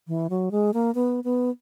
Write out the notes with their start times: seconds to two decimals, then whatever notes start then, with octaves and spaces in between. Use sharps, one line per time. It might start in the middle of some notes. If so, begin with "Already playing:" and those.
0.08 E3
0.30 F#3
0.51 G#3
0.74 A#3
0.95 B3
1.24 B3